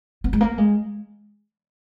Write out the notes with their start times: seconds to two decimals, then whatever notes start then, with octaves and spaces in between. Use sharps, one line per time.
0.24 B3
0.33 G#3
0.41 A#3
0.58 G#3